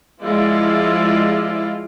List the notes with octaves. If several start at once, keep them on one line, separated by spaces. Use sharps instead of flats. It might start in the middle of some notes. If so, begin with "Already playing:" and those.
F3 G3 G#3 E4 F4 D5